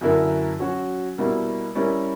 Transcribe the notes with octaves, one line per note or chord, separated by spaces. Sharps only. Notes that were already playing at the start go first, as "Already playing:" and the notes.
F#2 D3 A#3 E4 A#4
F#3 C#4 F#4
B2 G3 A#3 E4
G3 C#4 E4 A#4